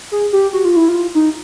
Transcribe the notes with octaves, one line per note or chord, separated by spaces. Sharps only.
G#4
G4
F#4
F4
E4
F4
D#4